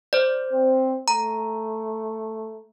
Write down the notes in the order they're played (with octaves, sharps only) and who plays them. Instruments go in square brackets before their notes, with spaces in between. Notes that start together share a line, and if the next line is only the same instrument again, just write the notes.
[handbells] C5 D5
[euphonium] C4
[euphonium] A3 [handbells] A#5